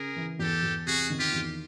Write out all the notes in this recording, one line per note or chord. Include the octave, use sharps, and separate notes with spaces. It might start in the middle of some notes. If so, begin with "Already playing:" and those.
Already playing: C#3 G#4 A#4
E3
E2 G4 A4
E2
C3 F#4 G#4
D#3
F4 G4
E2